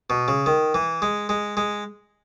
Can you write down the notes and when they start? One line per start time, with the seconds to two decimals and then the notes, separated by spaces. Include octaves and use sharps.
0.10 B2
0.28 C#3
0.46 D#3
0.74 E3
1.02 G#3
1.29 G#3
1.57 G#3